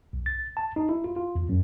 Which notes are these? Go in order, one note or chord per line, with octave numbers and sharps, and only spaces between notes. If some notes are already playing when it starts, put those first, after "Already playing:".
B1
A6
A5
D#4
E4
F4
F4
E2
F#2